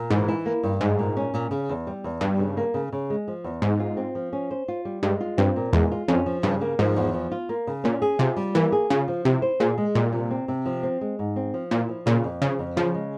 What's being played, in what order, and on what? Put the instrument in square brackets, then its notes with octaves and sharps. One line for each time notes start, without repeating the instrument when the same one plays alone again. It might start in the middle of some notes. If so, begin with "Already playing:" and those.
Already playing: [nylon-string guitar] A#2
[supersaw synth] G#2 [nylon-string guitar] E3
[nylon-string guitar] E4
A#3
G2
[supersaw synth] G#2 [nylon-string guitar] G#3
[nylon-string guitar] A#2
C#4
A#2
C#3
E2
G3
E2
[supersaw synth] G2 [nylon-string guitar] G3
[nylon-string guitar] C#3
A#3
C#3
C#3
G#3
F3
E2
[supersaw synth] G#2 [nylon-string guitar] G#3
[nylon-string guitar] F4
C4
F3
C#4
C5
F4
G3
[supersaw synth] G2 [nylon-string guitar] G#3
[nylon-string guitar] F4
[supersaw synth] G2 [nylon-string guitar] C4
[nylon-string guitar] A#2
[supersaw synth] E2 [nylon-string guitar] G#3
[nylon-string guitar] F4
[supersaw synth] F2 [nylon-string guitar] C#4
[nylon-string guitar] F3
[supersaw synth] G2 [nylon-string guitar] C#3
[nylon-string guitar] A#3
[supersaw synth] G#2 [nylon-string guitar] F3
[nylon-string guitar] E2
F3
F4
A#3
C#3
[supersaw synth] A#2 [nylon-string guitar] C#4
[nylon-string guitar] G#4
[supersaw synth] C3 [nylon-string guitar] F4
[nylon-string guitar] G3
[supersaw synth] E3 [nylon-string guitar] A#3
[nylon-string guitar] G#4
[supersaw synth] C#3 [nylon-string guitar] F4
[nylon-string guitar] F3
[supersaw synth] C3 [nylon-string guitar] E4
[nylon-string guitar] C5
[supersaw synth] A#2 [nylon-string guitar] G#4
[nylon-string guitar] G#3
[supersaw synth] A#2 [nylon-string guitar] G3
[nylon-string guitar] C3
C4
C3
F3
C4
G#3
G#2
C4
F3
[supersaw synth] A#2 [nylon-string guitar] E4
[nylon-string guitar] F3
[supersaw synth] A#2 [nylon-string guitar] C#3
[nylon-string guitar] F2
[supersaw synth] C#3 [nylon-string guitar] F3
[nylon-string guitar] F2
[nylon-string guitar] C#3 [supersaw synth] F3
[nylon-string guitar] G#3